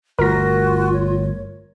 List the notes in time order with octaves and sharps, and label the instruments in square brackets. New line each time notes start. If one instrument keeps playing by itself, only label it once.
[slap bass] G1 A3 [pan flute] F4 [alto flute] F#4 [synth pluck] A#4 A#6
[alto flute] C#5